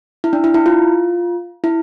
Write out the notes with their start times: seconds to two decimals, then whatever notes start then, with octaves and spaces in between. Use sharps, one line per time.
0.24 E4
0.33 D4
0.44 E4
0.54 E4
0.66 F4
1.64 E4